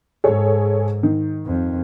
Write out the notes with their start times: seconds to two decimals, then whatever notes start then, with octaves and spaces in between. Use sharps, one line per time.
0.24 G#2 G#4 A4 C#5
1.03 D#3
1.46 F2